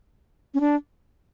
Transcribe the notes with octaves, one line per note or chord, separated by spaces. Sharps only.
C#4
D4